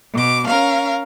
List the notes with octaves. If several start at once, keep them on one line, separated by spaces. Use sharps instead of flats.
B2 D6
C#4 A#4 F5